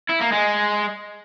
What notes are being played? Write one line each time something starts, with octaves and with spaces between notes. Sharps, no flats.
E4
A#3
G#3